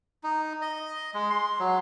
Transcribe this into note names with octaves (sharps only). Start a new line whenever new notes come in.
D#4
D#5
G#3
C6
F#3